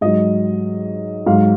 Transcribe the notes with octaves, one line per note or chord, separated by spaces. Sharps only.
G#2 F#3 D#5
G#2 F#3 F5